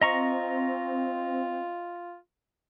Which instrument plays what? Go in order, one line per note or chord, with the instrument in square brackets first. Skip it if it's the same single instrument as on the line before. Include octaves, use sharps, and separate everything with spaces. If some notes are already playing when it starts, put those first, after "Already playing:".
[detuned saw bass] C4 [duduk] F4 [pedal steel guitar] D#5 A#5 C#6